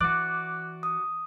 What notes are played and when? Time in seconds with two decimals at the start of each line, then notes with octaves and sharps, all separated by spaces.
0.01 E3 F#4 D5 D6 F#6
0.83 D#6